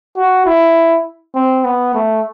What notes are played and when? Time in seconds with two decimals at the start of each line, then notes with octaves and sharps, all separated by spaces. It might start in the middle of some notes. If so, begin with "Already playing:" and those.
0.17 F#4
0.46 E4
1.35 C4
1.65 B3
1.95 A3